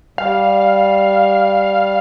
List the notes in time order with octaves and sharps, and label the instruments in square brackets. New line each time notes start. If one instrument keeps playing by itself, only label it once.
[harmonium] G3 [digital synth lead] F5